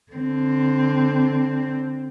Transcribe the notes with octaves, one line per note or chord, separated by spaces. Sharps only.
D3 C4